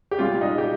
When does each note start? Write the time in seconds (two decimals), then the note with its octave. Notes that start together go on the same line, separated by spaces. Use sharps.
0.11 G4
0.19 C2 A#2 G3 F4
0.41 D#4
0.58 G4